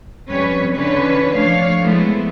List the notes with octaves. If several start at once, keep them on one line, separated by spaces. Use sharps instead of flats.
F2 G3 C#4 B4 C#5
D3 E3 C#4 D4 B4 C#5
F3 A3 D4 C#5 F5
F3 G#3 A3 B3 E4